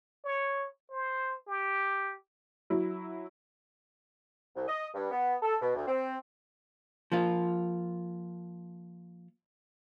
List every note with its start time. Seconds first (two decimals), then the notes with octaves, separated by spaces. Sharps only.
0.25 C#5
0.90 C5
1.47 G4
2.70 F#3 E4
4.56 C2
4.68 D#5
4.94 G2
5.11 B3
5.42 A4
5.62 B2
5.76 D2
5.87 C4
7.12 F3 A#3 F4